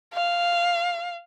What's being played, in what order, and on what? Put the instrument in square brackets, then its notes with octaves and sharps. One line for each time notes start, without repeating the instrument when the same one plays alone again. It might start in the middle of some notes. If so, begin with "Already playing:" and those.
[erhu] F5